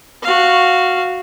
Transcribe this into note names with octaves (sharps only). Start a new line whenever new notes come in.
F#4 F5